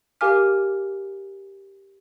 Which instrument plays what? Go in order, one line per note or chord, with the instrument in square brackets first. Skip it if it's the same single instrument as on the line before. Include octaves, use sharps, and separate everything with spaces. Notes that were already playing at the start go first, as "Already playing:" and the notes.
[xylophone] G4 A#4 F5 G#5 D6 F6